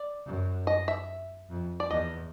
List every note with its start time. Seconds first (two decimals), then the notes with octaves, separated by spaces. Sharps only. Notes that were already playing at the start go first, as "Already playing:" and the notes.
Already playing: D5
0.26 F#2
0.67 D#5
0.88 E5
1.50 F2
1.80 D5
1.91 E2 D#5